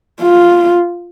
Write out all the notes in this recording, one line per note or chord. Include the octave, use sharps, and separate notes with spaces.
F4